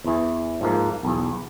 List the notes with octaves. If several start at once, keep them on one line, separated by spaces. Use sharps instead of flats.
E2 E3
G#2 F3 A#3
B1 E2